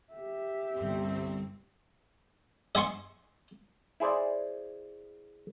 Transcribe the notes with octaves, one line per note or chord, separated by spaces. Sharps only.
G4 E5
G1 C2 C4
D#5 G#5 C6 C#6
E4 G#4 C5 D5